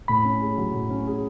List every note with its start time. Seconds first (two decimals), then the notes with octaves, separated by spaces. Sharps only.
0.08 A2 B5
0.25 C#4
0.42 G#4
0.58 F#3
0.74 A2
0.90 C#4
1.07 G#4